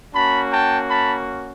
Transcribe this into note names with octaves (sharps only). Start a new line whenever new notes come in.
A#3 C#4 F#4 A5 B5
G5 A5
A5 B5